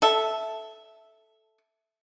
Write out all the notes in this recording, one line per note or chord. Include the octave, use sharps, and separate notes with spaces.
A4 E5